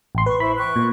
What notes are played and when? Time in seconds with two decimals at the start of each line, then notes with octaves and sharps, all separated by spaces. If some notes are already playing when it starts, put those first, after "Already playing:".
0.15 A1 C6
0.26 B4 C#6
0.40 E4 C5 B5
0.58 G5 C#6 F#6
0.76 A#2